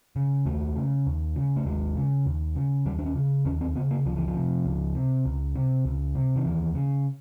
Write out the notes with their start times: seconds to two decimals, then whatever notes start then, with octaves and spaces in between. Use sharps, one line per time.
0.16 C#3
0.46 D#2 A3
0.76 C#3
1.07 D#2
1.36 C#3
1.56 A3
1.66 D#2 G#3
1.96 C#3
2.26 D#2
2.56 C#3
2.86 D#2 G3
2.99 D4
3.06 C#4
3.15 C#3
3.45 D#2 C#4
3.61 C4
3.75 C#3 B3
3.91 A#3
4.05 C#2 F3
4.16 E3
4.27 F3
4.35 C3
4.65 C#2
4.95 C3
5.25 C#2
5.55 C3
5.85 C#2
6.15 C3
6.36 D#3
6.45 D#2 E3
6.75 C#3